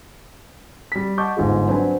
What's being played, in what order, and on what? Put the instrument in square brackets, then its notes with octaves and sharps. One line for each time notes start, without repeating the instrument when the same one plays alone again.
[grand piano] G3 B6
D#5 F#5 A5 C#6 D6 G6
G1 G#2 F4 G#4
F#3 C4 D4 F#4 B4 G#5